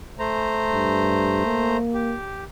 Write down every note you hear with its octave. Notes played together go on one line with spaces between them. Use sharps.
A3 C5 A#5
G2
A#3
G4